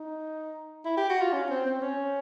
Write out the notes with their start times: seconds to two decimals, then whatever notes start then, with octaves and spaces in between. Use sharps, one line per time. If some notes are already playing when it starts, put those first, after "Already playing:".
Already playing: D#4
0.85 E4
0.97 G4
1.10 F#4
1.21 F4
1.33 C#4
1.50 C4
1.66 C4
1.82 C#4